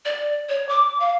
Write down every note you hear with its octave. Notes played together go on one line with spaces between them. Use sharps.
D5
C#5
D6
F5